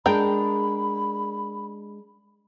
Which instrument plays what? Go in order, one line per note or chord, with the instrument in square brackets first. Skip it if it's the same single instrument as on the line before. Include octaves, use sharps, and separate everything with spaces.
[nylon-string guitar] G#3 D4 [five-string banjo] A#4 G5 [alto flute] B5